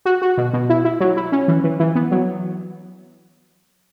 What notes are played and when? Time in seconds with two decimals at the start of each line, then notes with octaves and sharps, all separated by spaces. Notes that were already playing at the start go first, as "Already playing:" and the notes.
0.05 F#4
0.22 F#4
0.37 B2
0.53 B2
0.69 E4
0.85 E4
1.00 F#3
1.17 E4
1.32 C#4
1.48 E3
1.64 E3
1.80 E3
1.95 B3
2.11 F#3